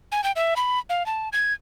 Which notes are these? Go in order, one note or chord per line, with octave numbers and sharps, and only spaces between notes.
G#5
G5
E5
B5
F5
A5
G#6